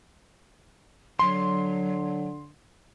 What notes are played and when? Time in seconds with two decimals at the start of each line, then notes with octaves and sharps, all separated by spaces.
1.19 D3 F#3 C6